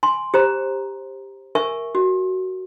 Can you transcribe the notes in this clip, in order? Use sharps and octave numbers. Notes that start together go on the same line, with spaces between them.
G#5 C6
G4 C5 A#5
A#4 E5 G#5 C#6
F#4